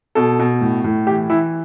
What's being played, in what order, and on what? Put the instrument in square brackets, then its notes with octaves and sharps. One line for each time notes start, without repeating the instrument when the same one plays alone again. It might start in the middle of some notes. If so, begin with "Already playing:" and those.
[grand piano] B2 A4
B2
A2
A2
E3 G4
E3 E4